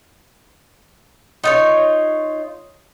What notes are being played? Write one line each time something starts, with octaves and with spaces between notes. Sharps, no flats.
D#4 F4 C#5